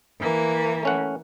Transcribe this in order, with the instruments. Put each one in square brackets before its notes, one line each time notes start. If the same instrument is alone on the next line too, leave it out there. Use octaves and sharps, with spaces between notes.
[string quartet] E3 A#3
[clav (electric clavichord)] A3 C#4 F#5